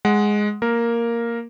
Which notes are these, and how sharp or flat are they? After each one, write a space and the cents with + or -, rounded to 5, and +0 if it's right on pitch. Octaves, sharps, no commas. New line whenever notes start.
G#3 +0 F#5 +0
A#3 +0 A#4 +0